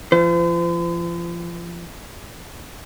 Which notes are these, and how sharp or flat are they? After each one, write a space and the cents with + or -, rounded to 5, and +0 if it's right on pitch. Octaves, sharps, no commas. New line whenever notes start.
F3 -30 C5 -45